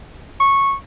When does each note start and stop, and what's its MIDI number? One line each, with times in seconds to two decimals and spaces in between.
0.40 0.73 85